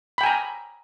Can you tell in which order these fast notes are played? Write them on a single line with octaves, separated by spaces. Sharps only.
B5 G5 G#5 A#5